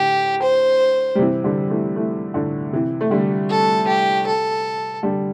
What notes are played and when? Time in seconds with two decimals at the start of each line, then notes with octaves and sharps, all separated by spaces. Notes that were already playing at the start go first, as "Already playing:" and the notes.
Already playing: A2 D3 G4
0.42 C5
1.15 G3
1.18 C3 E3
1.44 D3 G3
1.70 E3 A3
1.96 E3 A3
2.34 A2 D3
2.72 C3 E3
3.01 A3
3.11 D3 G3
3.50 A4
3.88 G4
4.27 A4
5.03 D3 G3